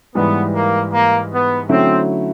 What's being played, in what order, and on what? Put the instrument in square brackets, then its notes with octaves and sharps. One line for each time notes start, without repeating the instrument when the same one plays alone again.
[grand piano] G#2 E3 G3 [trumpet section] B3
[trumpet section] A#3
A#3
B3
[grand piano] D3 F#3 A3 C#4 E4 [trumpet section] C4